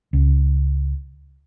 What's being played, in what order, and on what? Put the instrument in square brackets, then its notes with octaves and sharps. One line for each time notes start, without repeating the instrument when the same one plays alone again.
[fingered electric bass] C#2